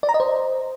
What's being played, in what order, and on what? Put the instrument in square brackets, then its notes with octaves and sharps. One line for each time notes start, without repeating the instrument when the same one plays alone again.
[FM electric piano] D5
A#5
D#5
C5